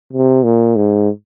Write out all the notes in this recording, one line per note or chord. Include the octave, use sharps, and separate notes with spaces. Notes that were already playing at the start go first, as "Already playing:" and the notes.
C3
A#2
G#2